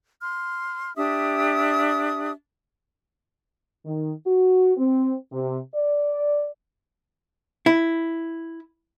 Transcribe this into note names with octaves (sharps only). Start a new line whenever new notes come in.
C6 F6
D4 G4 E5 D#6
D#3
F#4
C4
C3
D5
E4